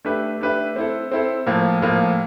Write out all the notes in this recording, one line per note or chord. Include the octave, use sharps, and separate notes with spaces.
A3 D4 G4 B4 E5
A3 D4 G4 B4 E5
C4 E4 A4
C4 E4 A4
A2 F3 A#3
A2 F3 A#3